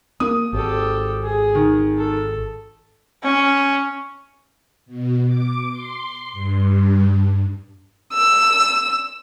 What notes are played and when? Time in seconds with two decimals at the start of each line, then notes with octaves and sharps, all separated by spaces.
0.20 A#3 D#6
0.53 G#1 G4 A4
1.24 G#4
1.55 D#3
1.98 A4
3.23 C#4
4.86 B2
5.26 D6
5.71 C6
6.32 G2
8.13 E6